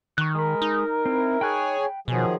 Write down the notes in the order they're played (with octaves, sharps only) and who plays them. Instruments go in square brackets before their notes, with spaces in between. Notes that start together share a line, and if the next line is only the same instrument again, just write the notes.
[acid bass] D#3 [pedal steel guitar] C#6 F#6
[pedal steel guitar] G#3 B5 [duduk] A#4
[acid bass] D#4
[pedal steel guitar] C4 [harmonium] E4
[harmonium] G#4 C#5 G#5 [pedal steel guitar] G5 B5 F#6
[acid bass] B2 [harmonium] D#3 F#3 G#4 [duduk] F3